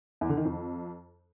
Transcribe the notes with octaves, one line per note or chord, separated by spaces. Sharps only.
E2
D3
D#3
F2